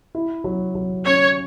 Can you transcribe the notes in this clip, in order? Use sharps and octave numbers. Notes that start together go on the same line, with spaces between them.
E4
F#3
F#3
C#4 C#5